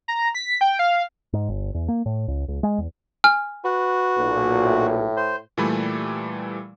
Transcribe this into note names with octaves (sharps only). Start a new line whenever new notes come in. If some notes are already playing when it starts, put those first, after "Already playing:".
A#5
B6
G5
F5
G#2
G1
E2
A#3
A2
C#2
C#2
G#3
E2
G#5 F6
F#4 B4
B1 A#2
A2
C5
A#2 E3 G3 A3 G#5 B5